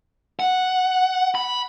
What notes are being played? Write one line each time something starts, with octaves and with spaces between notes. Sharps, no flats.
F#5
B5